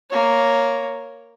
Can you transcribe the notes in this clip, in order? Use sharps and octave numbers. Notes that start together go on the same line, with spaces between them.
A#3 C#5